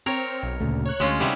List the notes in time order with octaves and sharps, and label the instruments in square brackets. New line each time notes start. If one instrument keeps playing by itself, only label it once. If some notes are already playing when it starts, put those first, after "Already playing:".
[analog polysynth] C4 [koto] A#4 C#5
[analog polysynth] B1
[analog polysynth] D2 [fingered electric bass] A#2 C#3 A3
[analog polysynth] C#5 F#6
[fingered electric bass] D2 [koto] G#3 C#4 F4
[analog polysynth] C3 D#4 D#6 [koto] G3 B3 E4